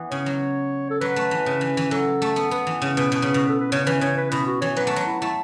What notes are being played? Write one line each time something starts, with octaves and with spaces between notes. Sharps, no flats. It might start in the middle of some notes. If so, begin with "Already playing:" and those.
Already playing: E3 B3
C#3 C#5
F#3
A4
F#3 B4
A3
E3
C#3
E3
E3
F#3 A4
A3
B3
B3 B4
E3
C#3
B2 B4
B2
C#3
B2
A4
B4
C#3 C#5
E3 B4
C#3 C#5
B4
B2 E4
F#4
E3 C#5
F#3 B4
A3
F#3 B4
E4
A3 E4